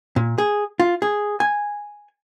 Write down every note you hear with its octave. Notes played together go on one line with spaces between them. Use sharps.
A#2
G#4
F4
G#4
G#5